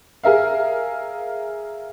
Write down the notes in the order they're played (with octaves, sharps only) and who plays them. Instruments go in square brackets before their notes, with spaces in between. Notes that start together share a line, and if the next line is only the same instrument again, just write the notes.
[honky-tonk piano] G#4 A#4 E5 F5